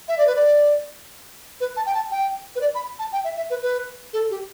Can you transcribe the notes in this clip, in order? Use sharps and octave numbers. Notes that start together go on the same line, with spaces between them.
E5
D5
B4
D5
B4
A5
G5
A5
G5
B4
D5
B5
A5
G5
E5
E5
B4
B4
A4
G4